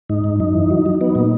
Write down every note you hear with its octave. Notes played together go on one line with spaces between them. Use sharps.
G#2 D#4
G#2
F#2 D#4
E3
F#3
F#3
B3 D#4
A#2